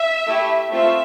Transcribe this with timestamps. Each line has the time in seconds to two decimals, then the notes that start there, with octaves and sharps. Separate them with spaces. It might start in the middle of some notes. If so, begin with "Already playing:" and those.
Already playing: E5
0.28 A3 E4 G4
0.71 A3 C4 F4 E5